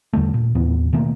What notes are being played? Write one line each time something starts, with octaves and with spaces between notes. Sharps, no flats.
E2 D3 G3 A3
A#2
D#2 A2 E3 B3
B2 D#3 A3 A#3